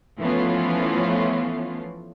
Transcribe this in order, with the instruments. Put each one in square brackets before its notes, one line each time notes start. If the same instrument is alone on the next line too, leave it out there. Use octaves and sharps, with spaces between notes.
[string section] E3 F3 A3 B3 C#4 F4